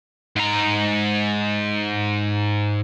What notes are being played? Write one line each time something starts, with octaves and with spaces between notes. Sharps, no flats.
G#2 A#5